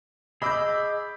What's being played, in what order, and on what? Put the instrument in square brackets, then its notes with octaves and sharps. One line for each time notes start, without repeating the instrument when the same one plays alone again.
[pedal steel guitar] G#4 D#5 E6 [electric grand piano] B5 D6 G6